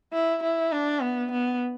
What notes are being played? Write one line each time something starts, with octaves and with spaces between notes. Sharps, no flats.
E4
E4
D4
B3
B3